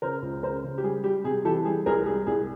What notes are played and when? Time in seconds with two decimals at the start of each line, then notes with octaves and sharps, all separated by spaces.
0.02 C#3 A#4 C5
0.22 C#2
0.43 C#3 A#4 C5
0.64 C#3
0.78 G4
0.83 G3 G#4
1.04 G3 G4
1.24 C3 G#4
1.45 E3 G4 A4
1.65 G3 G#4
1.86 C2 G#4 A#4
2.06 G3 G#4
2.27 C2 G#4